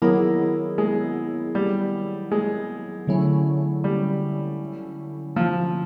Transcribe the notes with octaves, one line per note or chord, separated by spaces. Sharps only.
D#3 F#3 A#3 B3 E4 G#4
G#3
G3
G#3
D3 F#3 A3 C#4 E4
G3
F3